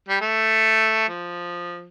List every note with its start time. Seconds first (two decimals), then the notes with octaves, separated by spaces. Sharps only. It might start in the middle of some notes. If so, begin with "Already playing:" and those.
0.09 G3
0.21 A3
1.09 F3